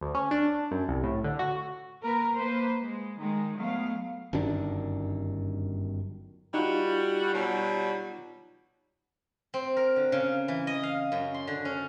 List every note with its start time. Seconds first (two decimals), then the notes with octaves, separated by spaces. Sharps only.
0.01 D2
0.15 C#4
0.31 D4
0.71 F#2
0.89 C2
1.03 A2
1.24 D3
1.39 F#4
2.01 A#3 A#4 B4
2.35 A#3 B4 C5
2.81 G#3
3.20 D#3 G#3
3.57 F#3 G#3 A3 B3 F5
4.33 G1 F#2 D#3 D4
6.54 G3 D#4 F4 F#4
7.34 B2 F#3 G3
9.54 C4
9.77 A#4
9.96 D3
10.12 C#3
10.48 E3
10.67 D#5
10.83 F5
11.12 F#2
11.34 C6
11.47 D3
11.65 C#4